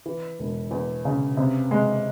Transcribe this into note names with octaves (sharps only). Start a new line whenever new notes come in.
E3
E1
E2
C#3
C3
G#3